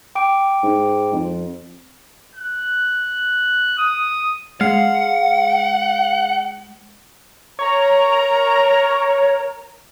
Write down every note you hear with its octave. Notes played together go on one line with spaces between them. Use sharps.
G5 D6 D7
G#2
F2
F#6
D#6
G#3 F5 F#5
A#4 C#5 A#5